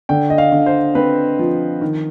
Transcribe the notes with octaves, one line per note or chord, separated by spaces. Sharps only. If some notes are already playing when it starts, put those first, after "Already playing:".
D3 G5
D#5
F5
D3
C5
C4 B4
F3
D#3